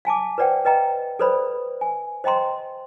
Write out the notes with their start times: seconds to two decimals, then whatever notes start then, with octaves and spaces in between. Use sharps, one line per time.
0.05 F5 G#5 A5 D6
0.38 B4 C5 D5 F#5 G5
0.65 B4 D#5 G5 A#5
1.19 A4 B4 C5 D5 B5
1.81 G#5
2.24 C5 D#5 G5 A#5 C6